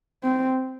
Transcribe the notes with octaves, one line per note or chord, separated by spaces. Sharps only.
C4